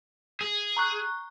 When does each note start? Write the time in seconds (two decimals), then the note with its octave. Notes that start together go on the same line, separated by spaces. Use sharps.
0.41 G#4
0.77 A#5 C#6 F#6